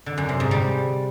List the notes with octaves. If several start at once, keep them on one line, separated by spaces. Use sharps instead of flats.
D3
F#2
C3
G#2
G3